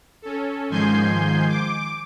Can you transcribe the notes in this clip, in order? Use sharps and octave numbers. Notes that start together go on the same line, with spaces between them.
C#4 A4
G#2 D#3 F3 G#5 C6 G6
D6